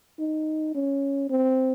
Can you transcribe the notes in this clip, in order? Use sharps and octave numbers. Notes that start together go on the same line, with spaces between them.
D#4
C#4
C4